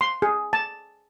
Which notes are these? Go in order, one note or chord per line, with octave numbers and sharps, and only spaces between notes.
C6
G#4
A5